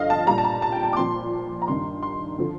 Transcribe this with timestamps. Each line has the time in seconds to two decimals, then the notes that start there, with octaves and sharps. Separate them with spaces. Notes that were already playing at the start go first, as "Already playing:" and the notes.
Already playing: G2 D3 F3 D#5 F5
0.10 A5
0.27 A#2 G3 A#5
0.38 A5
0.44 A#5
0.62 A5
0.72 G5
0.83 A5
0.93 D6
0.97 A#2 F3 C6
1.62 A#5
1.67 G2 D#3 G3 C6
2.03 C6
2.38 D3 F3